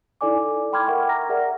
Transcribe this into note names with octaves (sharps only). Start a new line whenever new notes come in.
D#4 E4 A4 D5 G#5 D6
G5 B5 C6 D6 F6 G#6
A#4 E5 F#5 G5 C#6
A#5 F6 A#6
G#4 A#4 D5 E5 F#5